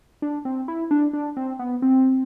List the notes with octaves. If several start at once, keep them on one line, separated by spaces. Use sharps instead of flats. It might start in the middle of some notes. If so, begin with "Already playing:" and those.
D4
C4
E4
D4
D4
C4
B3
C4